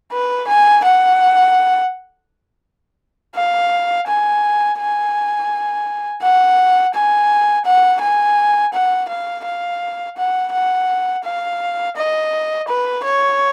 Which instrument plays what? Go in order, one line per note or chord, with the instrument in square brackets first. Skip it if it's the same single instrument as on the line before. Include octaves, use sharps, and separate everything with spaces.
[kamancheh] B4
G#5
F#5
F5
G#5
G#5
F#5
G#5
F#5
G#5
F#5
F5
F5
F#5
F#5
F5
D#5
B4
C#5